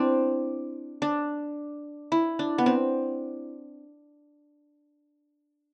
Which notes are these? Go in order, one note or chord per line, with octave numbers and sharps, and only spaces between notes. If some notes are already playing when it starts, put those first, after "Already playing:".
Already playing: C4 D4 E4
D4
E4
D4
B3
C4